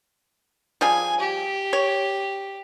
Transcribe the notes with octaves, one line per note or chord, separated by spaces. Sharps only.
F3 G3 G#4 G#5
G4
C#5